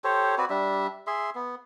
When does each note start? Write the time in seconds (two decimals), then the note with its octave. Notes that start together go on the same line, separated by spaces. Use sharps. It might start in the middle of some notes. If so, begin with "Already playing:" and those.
0.04 G4 A4 C5 C#5
0.38 C4 F#4 B4 D5
0.50 G3 D4 E5
1.07 G#4 E5 C6
1.35 B3